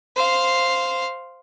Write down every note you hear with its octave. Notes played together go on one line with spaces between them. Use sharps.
C5 F5